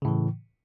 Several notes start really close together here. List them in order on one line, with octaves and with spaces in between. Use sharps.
C#3 A2 E3